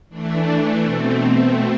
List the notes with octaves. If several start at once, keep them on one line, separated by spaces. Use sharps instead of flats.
E3 A3 D4
B2 A3 C4